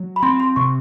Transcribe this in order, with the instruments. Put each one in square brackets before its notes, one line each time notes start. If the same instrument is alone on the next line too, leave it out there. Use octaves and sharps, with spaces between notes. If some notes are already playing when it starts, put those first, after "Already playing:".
Already playing: [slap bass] F#3
[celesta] B5
[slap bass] C4 [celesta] C6
[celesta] C6
[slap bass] C3 [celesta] C#6